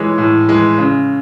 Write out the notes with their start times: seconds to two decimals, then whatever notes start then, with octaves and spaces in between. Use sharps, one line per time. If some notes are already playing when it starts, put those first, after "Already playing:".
Already playing: E3 G#3 C#5
0.18 A2
0.49 E3 G#3
0.78 C#3